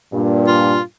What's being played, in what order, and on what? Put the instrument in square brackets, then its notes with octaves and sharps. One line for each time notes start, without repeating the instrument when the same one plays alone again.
[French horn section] G2 A#2
[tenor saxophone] F4